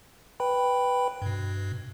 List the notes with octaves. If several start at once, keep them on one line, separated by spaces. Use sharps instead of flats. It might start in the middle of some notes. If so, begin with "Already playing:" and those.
B4 G5 B5
G2 B2